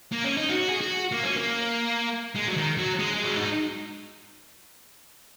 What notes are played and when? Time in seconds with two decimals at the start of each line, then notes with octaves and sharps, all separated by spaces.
0.12 A#3
0.24 C#4
0.38 D#4
0.49 F#4
0.69 G#4
0.81 F#4
1.12 A#3
1.24 C#4
1.36 A#3
2.36 G#3
2.48 F#3
2.57 D#3
2.78 F#3
2.99 G#3
3.13 G#4
3.24 F#4
3.37 D#4